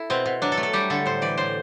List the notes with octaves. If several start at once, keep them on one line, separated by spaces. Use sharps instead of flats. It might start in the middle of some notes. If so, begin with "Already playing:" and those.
Already playing: E4 A4
B2 C4
B2
F#3 D4
A4
A3
A4
G3 G4
D3 A4
A2 C5
E3 D5
A2 C5